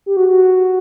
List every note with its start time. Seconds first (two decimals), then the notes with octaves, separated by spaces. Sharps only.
0.06 G4
0.17 F#4
0.27 F#4